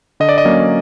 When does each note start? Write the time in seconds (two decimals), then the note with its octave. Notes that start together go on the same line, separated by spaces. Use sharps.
0.20 D3 D#5
0.29 D5
0.38 D#5
0.45 F#3 A#3 C#4